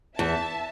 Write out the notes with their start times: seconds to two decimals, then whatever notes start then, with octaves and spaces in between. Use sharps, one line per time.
0.19 E2 E5 A5